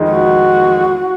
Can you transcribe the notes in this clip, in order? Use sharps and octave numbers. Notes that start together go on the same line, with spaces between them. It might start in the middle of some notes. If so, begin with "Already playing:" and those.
Already playing: F2 D#3 G#3 D#4
F#4